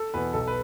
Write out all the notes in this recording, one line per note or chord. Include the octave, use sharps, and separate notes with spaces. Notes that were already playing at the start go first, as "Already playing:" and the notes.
Already playing: A4
E2 B2 B3 B4
B1 A4
B4